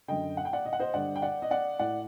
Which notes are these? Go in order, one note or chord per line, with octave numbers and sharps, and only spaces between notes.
F#2 D3 D#5 G5
F#5
G5
D5 F#5
D#5
F#5
C5 D#5
G2 D3 D5 F#5
G5
D5 F#5
D#5
D5 F#5
A2 D5 F#5